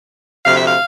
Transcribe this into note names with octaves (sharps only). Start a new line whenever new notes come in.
D2 C3 F3 F5
E5
F5